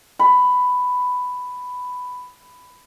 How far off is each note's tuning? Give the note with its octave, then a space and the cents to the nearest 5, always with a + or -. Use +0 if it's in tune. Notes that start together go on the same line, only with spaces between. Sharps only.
B5 +10